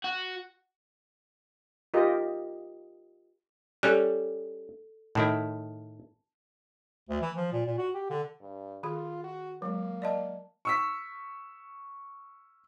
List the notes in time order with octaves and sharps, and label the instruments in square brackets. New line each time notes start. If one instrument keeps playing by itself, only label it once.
[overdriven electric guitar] F#4
[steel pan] F4 G4 A#4 D#5
[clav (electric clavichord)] G3 C#4 [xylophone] A4 F#6
[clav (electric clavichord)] A2 D#3 E4 [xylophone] A5
[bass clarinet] D2
E3
F3
A#2
A#2
F#4
G4
D3
[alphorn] G2
[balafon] D#3 G#4 [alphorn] F4
[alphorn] F#4
[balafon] F#3 G#3 [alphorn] A#3
[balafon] D5 D#5 A5
[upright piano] C#6 E6 B6